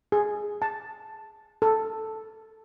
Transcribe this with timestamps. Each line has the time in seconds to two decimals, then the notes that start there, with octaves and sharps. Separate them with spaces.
0.12 G#4
0.62 A5
1.62 A4